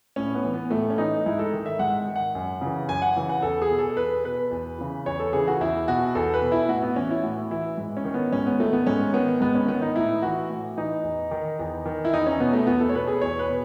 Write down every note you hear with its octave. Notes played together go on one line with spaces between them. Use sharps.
A2 C#4
B3
E3
B3
A2 A3
C#4
E3 D#4
G#2 E4
A4
D#3
E5
G#2 F#5
D#3
F#5
F#2
C#3 E3
F#2 G#5
F#5
C#3 E3
F#5
E2 A4
G#4
B2
A4
E2 B4
B2 B4
E2
C#3 E3
E2 C#5
A4
C#3 E3 G#4
F#4
E2 E4
B2 F#4
E2 A4
B4
B2
E4
A2 F#4
B3
E3 C#4
E4
A2 F#4
E3 E4
G#2
C#4
D#3
B3
G#2 C#4
B3
D#3 A3
B3
G#2 C#4
D#3 B3
G#2 B3
C#4
D#3 B3
D#4
A2 E4
E3 F#4
A2
E3 D#4
E2
D#3
E2
D#3
E4
E2 D#4
C#4
B2 B3
A3
E2 B3
A4
C#5
B2 B4
G#4
E2 C#5
B4
B2